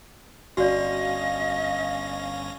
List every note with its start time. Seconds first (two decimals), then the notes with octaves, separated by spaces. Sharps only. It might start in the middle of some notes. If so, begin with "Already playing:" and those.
0.57 G1 C#4 F#4 D5 D#5 F5 A#6